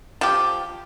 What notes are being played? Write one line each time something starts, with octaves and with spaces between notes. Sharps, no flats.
F3 G4